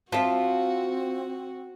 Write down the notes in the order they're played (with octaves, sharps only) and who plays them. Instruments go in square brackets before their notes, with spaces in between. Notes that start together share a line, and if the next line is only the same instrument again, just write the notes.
[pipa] F3 [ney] C4 [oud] F4 E5 [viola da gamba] F#4